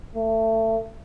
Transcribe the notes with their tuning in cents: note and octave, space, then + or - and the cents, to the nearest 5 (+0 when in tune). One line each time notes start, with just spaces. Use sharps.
A3 +25